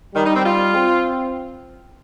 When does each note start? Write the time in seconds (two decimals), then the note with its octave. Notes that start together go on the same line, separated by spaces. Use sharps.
0.15 D#3 G3
0.25 D#4
0.35 C4
0.45 F4
0.75 C4